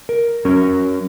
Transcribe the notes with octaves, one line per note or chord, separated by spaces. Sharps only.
A#4
F#3 C#4 A#4